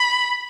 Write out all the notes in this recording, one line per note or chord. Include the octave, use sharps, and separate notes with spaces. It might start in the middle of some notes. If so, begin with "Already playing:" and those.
Already playing: B5